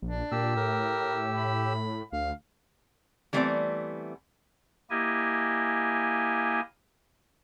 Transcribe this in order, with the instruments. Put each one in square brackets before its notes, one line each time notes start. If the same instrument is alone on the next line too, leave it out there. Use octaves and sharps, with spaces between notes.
[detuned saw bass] A#1 [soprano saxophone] D4
[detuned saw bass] A#2 [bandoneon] G4 E6
[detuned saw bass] A2 [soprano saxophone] A#4
[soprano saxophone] B5
[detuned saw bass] D2 [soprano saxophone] F5
[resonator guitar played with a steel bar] E3 G3 A3 B3 C4 D5
[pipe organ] A#3 E4 G4 D#5 G#5